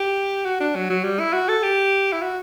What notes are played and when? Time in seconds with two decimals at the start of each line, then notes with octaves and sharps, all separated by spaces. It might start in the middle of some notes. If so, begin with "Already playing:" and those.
Already playing: G4
0.45 F#4
0.60 D4
0.76 F#3
0.90 F#3
1.04 G3
1.20 E4
1.33 F#4
1.49 A4
1.63 G4
2.13 E4
2.22 F#4